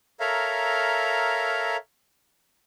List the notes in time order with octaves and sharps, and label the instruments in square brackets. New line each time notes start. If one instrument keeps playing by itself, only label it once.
[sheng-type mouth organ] A4 A#4 C#5 E5 F5 A#5